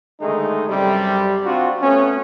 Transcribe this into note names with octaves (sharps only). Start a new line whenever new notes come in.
D3 D#3 G#3 A3 D#4
F#2 C3 G3
C4 D4 F4 F#4
A3 B3 C#4